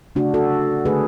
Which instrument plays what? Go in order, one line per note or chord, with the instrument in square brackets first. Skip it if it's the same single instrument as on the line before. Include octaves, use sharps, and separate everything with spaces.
[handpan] C#3 F#3 A3 D4 F#4
F#4 A4
D3 A3 G#4 B4